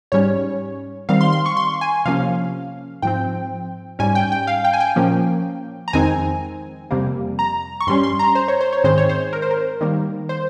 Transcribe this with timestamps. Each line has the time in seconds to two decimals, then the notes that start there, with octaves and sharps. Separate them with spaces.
0.12 G#2 G3 C#4 C#5
1.09 D#3 G3 C4 F5
1.21 C6
1.33 C6
1.46 C#6
1.57 C6
1.81 G#5
2.06 C3 F3 A#3 C#4 F5
3.02 G#2 F3 C4 G5
3.99 G#2 G3 C#4 G#5
4.15 G5
4.32 G5
4.47 F5
4.64 G5
4.73 G#5
4.80 G5
4.96 A#2 F3 A#3 C#4
5.88 A#5
5.93 F2 D#3 G#3 C4 D#4 G#5
6.91 F2 C3 G3 A#3
7.39 A#5
7.81 C#6
7.87 G2 G3 C#4 C6
8.03 C6
8.19 A#5
8.35 C5
8.48 C#5
8.60 C5
8.73 C#5
8.84 G#2 D#3 G#3 C4 C5
8.98 C#5
9.09 C5
9.33 A#4
9.42 C5
9.51 A#4
9.81 D#3 G3 A#3
10.29 C5